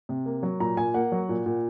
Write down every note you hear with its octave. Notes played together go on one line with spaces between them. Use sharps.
C3
A#3
F#3
A#2 A#5
A#2 G#5
A#3 F#5
F#3
A#2
A#2